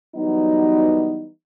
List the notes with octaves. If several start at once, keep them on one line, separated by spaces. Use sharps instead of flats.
E3 F#3 G3 B3 D#4